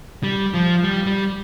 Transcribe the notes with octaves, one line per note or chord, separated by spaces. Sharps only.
G3
F3
G3
G3